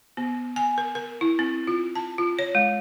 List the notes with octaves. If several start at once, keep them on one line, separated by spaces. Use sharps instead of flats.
B3
G#5
A#4
A#4
E4
C4
F4
A5
F4
C#5
G#3